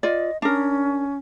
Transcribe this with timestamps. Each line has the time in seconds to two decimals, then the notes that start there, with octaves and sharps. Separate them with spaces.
0.03 F4 D5 D#5
0.42 C#4 D4 A#4